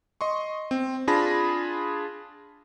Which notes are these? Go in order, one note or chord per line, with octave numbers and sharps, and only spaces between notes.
D#5 C6 C#6
C4
D4 F4 G#4 A5 B5 A#6